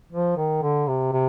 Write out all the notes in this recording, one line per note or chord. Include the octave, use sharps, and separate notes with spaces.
F3
D#3
D3
C3
C3